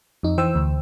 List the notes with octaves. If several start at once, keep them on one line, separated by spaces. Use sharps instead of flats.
F2 D#4
E3 C5 G5 E6
D2